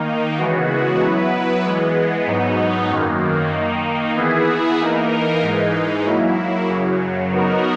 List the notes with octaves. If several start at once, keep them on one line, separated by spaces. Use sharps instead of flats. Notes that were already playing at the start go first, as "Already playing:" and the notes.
Already playing: D#3 A#3 D#4
C#3 E3 G#3 B3 F#4
F#3 B3 E4 B4
E3 G#3 B3
G#2 F#3 B3 D#4
F#2 D#3 A#3
D#3 A#3 D#4
E3 B3 E4 G#4
E3 A#3 D#4 A#4
G#2 E3 G#3 D#4
F#3 A#3 E4
F#2 C#3 F#3
F#3 B3 D#4 F#4 A#4